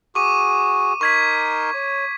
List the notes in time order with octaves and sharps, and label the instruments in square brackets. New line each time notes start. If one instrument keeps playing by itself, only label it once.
[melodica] F#4 G#4 [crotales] C#6 D6 D#7
[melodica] D#4 A#4 C6 [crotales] C#6 G#6 B6
[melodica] C#5